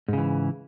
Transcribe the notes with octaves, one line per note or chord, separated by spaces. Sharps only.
G#2 C#3 E3